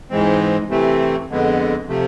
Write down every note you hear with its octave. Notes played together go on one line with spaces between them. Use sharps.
G#2 E3 G#3 C4
C3 E3 A3 C4
F2 D3 G#3 B3
C3 F3 A3